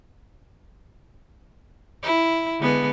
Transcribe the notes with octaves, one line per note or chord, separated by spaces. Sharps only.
E4
D3 G#3 B3